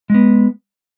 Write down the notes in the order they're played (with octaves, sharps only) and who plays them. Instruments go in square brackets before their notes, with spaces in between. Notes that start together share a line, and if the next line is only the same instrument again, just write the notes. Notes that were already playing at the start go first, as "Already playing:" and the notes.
[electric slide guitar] G#3 B3